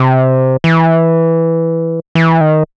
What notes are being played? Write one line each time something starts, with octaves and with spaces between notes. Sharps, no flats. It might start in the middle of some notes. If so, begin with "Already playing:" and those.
Already playing: C3
E3
E3
D#3